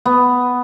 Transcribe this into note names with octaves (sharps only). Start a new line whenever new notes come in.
B3